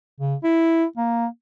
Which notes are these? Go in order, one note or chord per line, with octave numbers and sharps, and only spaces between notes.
C#3
E4
A#3